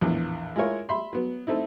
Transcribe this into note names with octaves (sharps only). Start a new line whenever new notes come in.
A#1 E2 A2
G#3 E4 F4 A#4 C#5
E5 B5 C6
F#3 B3
A3 C4 D#4 E4